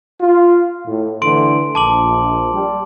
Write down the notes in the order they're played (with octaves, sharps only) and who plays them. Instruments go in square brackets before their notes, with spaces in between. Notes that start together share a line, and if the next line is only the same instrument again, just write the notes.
[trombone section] F4
A2
[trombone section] D3 E3 A3 [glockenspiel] C6 D7
[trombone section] A#1 [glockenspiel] A5 D6 F#7
[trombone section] G3